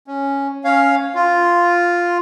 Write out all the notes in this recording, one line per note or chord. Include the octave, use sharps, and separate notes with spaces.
C#4
C#4 C#5 F5
F4